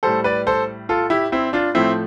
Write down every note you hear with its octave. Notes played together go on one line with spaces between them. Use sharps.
A2 G3 A4 C5
B4 D5
A4 C5
F4 A4
E4 G4
C4 E4
D4 F4
A2 F3 A3 C4 E4